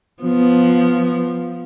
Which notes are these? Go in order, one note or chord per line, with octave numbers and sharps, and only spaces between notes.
F3 B3